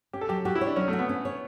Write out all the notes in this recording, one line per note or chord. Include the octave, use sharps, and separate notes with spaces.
C#4 G4
A4
F#3 G4
F#4 G4
E4
C#5
D4
F#3 C#4
A3
F#4
B3
C#4
C#5